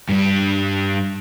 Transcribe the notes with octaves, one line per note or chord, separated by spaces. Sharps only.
G2 G3